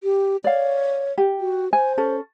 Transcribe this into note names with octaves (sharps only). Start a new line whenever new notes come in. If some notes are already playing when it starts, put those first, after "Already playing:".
G4
C#5 D5 F5
G4
F#4
C5 G#5
C#4 A4